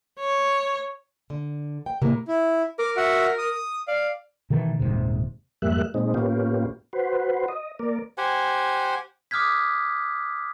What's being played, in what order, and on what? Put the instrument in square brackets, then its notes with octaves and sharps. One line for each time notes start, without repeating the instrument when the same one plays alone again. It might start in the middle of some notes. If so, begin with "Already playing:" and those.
[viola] C#5
[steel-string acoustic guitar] D3
G5
[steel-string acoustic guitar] A2 A#3 [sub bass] C3
[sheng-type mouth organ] E4
[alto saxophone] A#4 [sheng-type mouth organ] D6
[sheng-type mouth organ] F#4 E5 F#5
D#6
[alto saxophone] D5 [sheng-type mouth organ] F5
[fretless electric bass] B2 D#3 E3 A3
D#1 A#1 G#2 C3
[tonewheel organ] F2 G#2 G3 A#3 E5 F#6
A#2 G#3 C4 D#4
A2 A#3 B3 C#4 F4 G4
F#4 B4 C5
D#5
A#3 A#4 D5
[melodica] G4 C5 F#5 G#5
[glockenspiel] D6 D#6 F6 F#6 G#6 B6